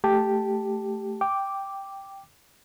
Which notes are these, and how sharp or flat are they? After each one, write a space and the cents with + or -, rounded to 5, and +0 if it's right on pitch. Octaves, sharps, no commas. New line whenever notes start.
A3 +0 G4 +0 A5 +0
G5 +0 D6 -5